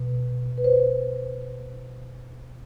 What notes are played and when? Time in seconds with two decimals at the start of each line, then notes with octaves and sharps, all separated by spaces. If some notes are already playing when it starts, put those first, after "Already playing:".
Already playing: B2
0.58 B4
0.64 C5